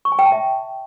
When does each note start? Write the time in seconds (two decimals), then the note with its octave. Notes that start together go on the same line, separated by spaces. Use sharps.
0.05 C#6
0.12 G#5
0.19 G5
0.25 A5
0.32 E5